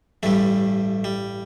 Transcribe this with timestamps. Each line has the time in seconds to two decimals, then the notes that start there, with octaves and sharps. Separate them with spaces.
0.23 A1 G2 G3 A3
1.04 G3